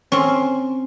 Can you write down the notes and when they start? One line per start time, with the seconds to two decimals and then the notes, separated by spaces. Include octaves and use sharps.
0.12 C4 C#4